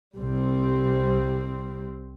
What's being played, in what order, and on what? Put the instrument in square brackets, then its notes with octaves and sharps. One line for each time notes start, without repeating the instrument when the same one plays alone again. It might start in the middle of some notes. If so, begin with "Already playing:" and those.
[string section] C2 G3 C4